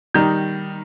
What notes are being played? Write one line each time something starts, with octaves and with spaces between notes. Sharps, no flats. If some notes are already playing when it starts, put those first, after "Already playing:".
D#3 G3 D#4 G6